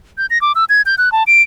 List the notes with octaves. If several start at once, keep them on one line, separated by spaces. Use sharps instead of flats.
G6
A#6
D6
E6
G#6
G6
F#6
A5
D7